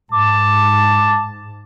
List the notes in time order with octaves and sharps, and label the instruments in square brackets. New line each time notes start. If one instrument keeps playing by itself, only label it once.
[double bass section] G#2 [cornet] A5 [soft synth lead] D6